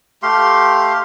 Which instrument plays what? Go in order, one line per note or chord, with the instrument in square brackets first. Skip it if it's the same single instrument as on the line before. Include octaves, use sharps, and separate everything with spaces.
[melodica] A3 G4 F5 C6